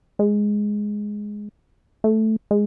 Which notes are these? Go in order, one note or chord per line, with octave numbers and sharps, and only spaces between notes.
G#3
A3
G#3